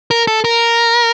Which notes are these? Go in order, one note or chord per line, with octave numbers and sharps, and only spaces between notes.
A#4
A4
A#4